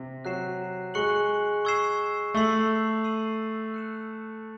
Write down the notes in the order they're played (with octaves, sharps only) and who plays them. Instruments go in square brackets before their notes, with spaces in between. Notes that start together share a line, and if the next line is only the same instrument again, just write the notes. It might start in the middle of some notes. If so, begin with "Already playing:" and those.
Already playing: [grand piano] C3
[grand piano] F#3 [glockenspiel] F#6 C7 E7
[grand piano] G#3 [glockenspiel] C#6 F#6 C#7 F#7
[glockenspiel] C#6 E6 G#6 C7 E7
[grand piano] A3 [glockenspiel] C#6 E6 C7 F#7
[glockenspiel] E6 C7 D#7 F#7
F#6 C#7 E7